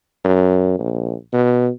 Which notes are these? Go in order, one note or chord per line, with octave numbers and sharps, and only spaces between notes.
F#2
A#1
B2